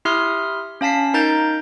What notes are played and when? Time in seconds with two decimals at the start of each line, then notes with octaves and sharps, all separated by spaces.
0.05 E4 G4 E5 C6 D#6 F6
0.81 C#4 F5 A5 B6 C7
1.14 D#4 A#4 A#5 G6 A6 D7